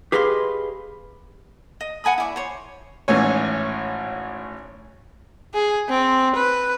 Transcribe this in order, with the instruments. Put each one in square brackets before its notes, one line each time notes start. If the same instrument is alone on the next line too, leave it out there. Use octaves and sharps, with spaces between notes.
[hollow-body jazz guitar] G4 G#4 B4 D#5 F5 C6
[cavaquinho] D#5
F#5 G#5 B5 D#6
E4 D5 C#6
C5 C#5
[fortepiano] G#1 A2 E3 C#4 C#5
[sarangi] G#4
C4
B4